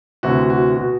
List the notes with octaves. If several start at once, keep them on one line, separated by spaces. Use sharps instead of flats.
D2 C3 E3 F#4
F#4
B2 F#4